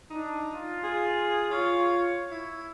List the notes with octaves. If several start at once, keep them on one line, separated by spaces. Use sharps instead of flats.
D4 D#4
F4
G#4
F4 C#5
E4